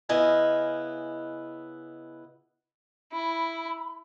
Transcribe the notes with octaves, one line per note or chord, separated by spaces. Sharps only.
C#3 B3 E4 D#5 F5 G#5
E4 B5